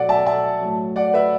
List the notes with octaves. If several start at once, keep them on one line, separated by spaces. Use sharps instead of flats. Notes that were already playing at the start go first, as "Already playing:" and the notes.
Already playing: B2 F#3 D5 F#5
E5 A5
E5 A5
A2 F#3
D5 F#5
B4 E5